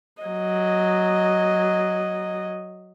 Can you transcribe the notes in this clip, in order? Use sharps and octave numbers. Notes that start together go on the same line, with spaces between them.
F#3 D#5